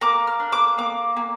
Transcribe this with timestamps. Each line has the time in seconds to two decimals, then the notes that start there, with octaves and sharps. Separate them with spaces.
0.01 A#3 D6
0.27 F6
0.40 D4
0.52 D6
0.78 A#3 D6
1.17 A#3